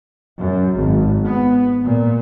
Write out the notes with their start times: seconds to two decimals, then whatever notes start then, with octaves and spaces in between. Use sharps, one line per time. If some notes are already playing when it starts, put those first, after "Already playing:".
0.40 F#2
0.76 G#1
1.26 B3
1.84 A#2